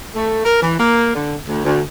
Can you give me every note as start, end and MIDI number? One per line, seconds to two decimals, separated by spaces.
0.15 0.42 57
0.44 0.61 70
0.62 0.77 52
0.79 1.11 58
1.15 1.36 50
1.48 1.64 38
1.65 1.81 38